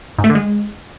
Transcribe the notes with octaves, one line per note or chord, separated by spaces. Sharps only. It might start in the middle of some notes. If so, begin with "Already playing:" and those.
G#2
A3
D3
G#3